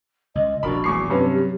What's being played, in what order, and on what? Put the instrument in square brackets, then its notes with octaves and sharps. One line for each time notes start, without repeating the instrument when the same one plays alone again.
[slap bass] C#2 [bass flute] D#5
[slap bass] D#1 A#1 [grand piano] D4 A#4 B5 [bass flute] F#4
[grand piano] E2 C#6 C7
[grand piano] G2 C3 C#4 [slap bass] F#3 [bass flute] B4
[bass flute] G4